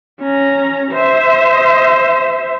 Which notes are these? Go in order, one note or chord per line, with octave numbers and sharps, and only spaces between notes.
C#4 A#5
C5 E5